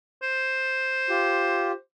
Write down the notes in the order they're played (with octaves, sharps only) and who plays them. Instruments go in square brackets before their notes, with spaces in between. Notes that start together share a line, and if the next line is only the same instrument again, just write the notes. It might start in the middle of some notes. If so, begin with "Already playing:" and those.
[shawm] C5
[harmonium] F4 G4